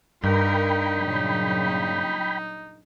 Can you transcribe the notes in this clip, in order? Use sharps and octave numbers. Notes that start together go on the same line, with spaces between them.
G2 D#4 A#4 G5 B5
A#2 C#3 F#3